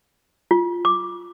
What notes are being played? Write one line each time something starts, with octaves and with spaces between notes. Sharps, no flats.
F4
D6